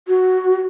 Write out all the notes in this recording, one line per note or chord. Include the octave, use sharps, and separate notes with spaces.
F#4